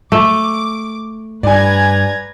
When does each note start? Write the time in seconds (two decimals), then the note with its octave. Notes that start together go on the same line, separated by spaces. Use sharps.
0.12 A3 D6
1.43 G2 B4 D5 G#5 A#5 G#6